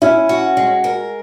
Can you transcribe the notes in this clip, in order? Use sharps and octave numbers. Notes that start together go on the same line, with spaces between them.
C#4 E4
F#4
G#3
A#4